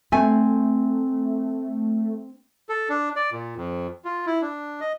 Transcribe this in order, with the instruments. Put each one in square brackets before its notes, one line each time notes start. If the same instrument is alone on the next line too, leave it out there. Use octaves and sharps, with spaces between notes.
[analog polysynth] A3 [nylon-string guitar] C4 G#5
[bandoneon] A4
D4
D5
A#2
F2
F4
E4
D4
D#5